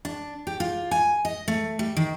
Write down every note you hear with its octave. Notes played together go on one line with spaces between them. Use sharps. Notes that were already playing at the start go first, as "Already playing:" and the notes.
D4
G4
F4
G#5
D#5
A3
G3
D#3